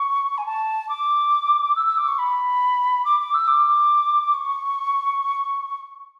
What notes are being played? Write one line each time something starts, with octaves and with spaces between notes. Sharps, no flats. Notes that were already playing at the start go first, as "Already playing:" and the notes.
Already playing: C#6
G#5
A5
D6
E6
E6
D6
C#6
B5
D6
D6
E6
D6
C#6